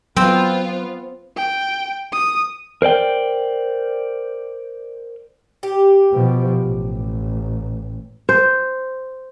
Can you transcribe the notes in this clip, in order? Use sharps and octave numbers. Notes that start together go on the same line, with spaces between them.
F#3 B3 C4 F4
G5
D#6
A#4 C5 D5 G5
G4
B2 F3
A1
C5